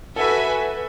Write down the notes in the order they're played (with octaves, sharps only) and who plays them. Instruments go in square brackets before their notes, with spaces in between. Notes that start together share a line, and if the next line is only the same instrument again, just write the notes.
[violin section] F#4 B4 E5 G#5 [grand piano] A4